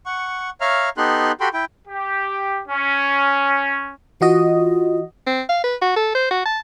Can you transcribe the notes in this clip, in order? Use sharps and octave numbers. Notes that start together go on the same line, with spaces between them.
F#5 C#6
C#5 E5 F5 A#5 F6
B3 D#4 G4 A4 C6 F#6
F#4 G4 A4 G5 B5 C6
E4 G5
G4
C#4
E3 F4 F#4 D#5
C4
F5
B4
F#4
A4
C5
F#4
A5